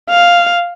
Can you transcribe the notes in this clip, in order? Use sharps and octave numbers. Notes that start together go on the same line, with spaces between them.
F5